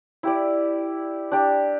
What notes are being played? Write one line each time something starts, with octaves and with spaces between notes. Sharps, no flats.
E4 G4 D5
D4 G4 D5